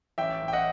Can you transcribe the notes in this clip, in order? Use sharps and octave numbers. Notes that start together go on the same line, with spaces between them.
A1 E5 G5
A1
G5
D#5 F#5